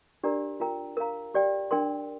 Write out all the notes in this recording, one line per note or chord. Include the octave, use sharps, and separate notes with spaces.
D4 G4 A#4 D5 A#5
F4 A#4 G5 A#5
A#4 F5 A#5
G4 D5 G5
D4 A#4 G5 C6